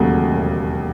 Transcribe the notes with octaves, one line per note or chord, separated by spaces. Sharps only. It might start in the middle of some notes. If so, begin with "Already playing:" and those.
Already playing: E1 D#2 C#3 F#3 A3 F#5
E1